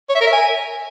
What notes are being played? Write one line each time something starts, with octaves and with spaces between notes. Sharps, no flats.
C#5
E5
A#4
E5
G#5